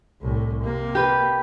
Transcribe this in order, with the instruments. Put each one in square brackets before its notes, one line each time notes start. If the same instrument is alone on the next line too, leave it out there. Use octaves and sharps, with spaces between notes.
[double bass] C2 A2
C3 A#3
[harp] G4 B4